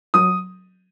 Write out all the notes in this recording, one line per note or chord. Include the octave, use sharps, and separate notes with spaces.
F#3 D#6